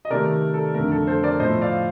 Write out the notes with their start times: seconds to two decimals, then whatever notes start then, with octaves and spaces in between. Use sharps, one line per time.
0.05 D#5
0.10 C3 D#3 A3 A#4 D5
0.54 A4
0.74 F2 D3 A3 A#4
0.92 A4
1.07 A4 C5
1.23 A#4 D5
1.39 A2 F3 A3 C5 D#5
1.61 D5 F5